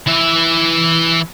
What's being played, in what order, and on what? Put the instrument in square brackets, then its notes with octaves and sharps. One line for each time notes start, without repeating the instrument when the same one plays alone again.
[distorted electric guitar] E3 E5